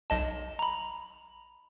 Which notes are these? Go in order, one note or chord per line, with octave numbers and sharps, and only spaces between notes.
B1 D#5 A5
A#5 B5